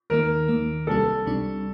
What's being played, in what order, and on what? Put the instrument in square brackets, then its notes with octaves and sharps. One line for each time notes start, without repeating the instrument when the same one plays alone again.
[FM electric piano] D#2 D#3 A#3 [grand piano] A#4
[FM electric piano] D#2 D#3 A#3
[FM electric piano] C2 C3 G3 D4 [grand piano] A4
[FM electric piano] C2 C3 G3 D4